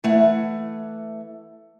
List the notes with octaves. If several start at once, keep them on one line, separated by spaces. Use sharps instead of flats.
E3 A3 F#5